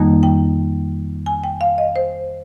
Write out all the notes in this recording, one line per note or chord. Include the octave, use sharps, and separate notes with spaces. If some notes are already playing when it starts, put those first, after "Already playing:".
Already playing: F2 D#3 G3 A#3 D#4
G5
G#5
G5
F5
D#5
C5